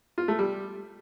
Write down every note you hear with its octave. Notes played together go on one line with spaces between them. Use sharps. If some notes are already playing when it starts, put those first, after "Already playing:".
F4
A3
G3